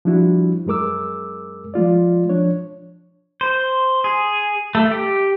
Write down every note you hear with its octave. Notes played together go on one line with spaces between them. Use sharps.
F3 G3 D4 E4 F#4
F#2 G#3 G#4 A#4 D6 E6
F3 G#3 F4 D5
F3 D4 C#5
C5
G#4
A3
G4